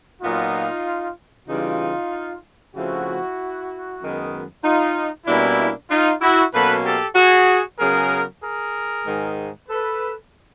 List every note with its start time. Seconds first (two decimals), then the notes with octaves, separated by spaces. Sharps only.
0.22 A#2 F#3 B3 D#4 F4
1.48 C#3 E3 G3 D#4 F4
2.74 C#3 F3 A3 C4 E4 F#4
4.00 F#2 D#3 G#3 B3
4.64 D#4 F4
5.26 B2 G3 A#3 C#4 D4 E4
5.90 D#4 F4
6.21 E4 F#4
6.53 B2 F#3 A#3 C#4 A4 B4
6.84 G4 A4
7.15 F#4 G#4
7.79 C#3 F#3 B3 G#4 A#4
8.42 G#4 A#4
9.05 G#2 D#3 G#3
9.68 A4 B4